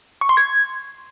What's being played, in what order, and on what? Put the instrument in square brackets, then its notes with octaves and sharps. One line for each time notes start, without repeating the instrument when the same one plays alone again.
[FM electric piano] C#6
C6
G#6